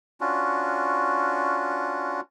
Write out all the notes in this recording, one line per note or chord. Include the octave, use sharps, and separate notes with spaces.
C#4 D4 F4 F#4